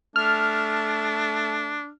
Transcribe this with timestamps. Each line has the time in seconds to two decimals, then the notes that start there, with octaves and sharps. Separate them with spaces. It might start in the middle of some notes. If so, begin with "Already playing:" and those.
0.16 A3 D4 F6